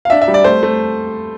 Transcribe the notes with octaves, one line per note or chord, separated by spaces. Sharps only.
F5
D4 E5
E5
G3
D5
A3 C5
A3